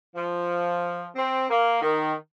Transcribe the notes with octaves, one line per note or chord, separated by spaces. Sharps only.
F3
C4
A#3
D#3